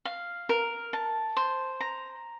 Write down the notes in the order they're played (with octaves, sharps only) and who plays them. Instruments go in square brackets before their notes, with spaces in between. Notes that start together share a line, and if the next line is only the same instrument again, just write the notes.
[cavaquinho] F5
A#4
A5
C5
A#5